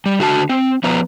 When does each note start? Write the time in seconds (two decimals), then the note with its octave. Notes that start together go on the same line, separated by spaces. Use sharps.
0.06 G3
0.20 D3 F#4 A5
0.49 C4
0.84 F3 B3 B4 A#5